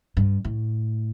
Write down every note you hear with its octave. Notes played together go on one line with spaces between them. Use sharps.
G2
A2